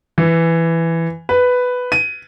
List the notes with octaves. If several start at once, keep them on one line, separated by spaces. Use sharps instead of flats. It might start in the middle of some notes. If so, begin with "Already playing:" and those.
E3
B4
D#7